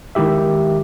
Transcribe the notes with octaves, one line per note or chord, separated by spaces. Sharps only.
D#3 G#3 E4 G4 E5